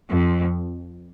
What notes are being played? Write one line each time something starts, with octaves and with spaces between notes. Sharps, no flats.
F2